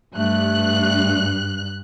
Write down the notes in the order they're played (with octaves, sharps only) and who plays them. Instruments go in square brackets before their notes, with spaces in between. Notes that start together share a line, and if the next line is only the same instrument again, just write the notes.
[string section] G2 F#6 [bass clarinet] A3